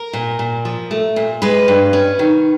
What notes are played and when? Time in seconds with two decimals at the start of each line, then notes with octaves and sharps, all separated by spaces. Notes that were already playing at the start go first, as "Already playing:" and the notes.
Already playing: A#4
0.13 A#2
0.39 A#2
0.65 F3
0.91 A3
1.16 A#2
1.42 G#3 B4
1.68 G2
1.93 C#4
2.19 D#3